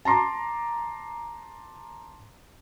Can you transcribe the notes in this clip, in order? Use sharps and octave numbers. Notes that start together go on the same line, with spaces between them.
A5 A#5 C6 D6